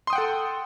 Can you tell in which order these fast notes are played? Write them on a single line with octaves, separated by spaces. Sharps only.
C6 D#6 G5 F#5 A4